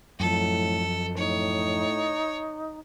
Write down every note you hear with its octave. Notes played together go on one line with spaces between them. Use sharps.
F#2 A2 F3 A4
A2 D#4 C#5